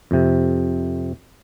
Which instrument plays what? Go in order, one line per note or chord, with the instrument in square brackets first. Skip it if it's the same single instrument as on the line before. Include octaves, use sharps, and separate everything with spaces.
[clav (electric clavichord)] F2 C3